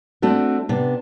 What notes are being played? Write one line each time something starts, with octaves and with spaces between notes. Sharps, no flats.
A3 C4 D4 F#4
C3 B3 D4